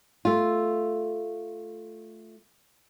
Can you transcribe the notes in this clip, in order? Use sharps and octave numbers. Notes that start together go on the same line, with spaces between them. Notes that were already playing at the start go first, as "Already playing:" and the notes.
A3 F4